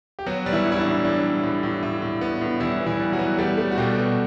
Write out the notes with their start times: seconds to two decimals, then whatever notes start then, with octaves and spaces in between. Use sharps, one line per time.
0.19 G4
0.26 F#3 B3 F#4
0.46 G3
0.53 E3 E4
0.65 A2
0.72 E4
0.79 D4
0.85 A2
1.04 A2 D4
1.24 G3
1.43 A2
1.63 A2
1.83 A2
2.02 A2
2.21 B3
2.41 A2
2.60 E3 G3 E4
2.80 B3
2.86 E3 E4
3.00 G3
3.12 F#3 F#4
3.19 B3
3.38 G3 A3 G4
3.58 A3
3.71 F#4
3.78 B2 G3 G4
3.97 B2